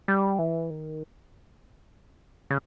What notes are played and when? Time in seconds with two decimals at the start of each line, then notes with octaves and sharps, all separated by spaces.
0.08 G3
0.39 E3
0.70 D#3
2.51 C#3